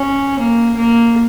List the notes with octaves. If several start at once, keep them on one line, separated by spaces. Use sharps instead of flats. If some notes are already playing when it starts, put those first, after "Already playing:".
Already playing: C#4
A#3
A#3